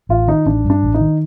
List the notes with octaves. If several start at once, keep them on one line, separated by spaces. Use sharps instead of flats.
A1 F4
D#3 D#4
A1 D4
G2
D4
A1
D#4
D#3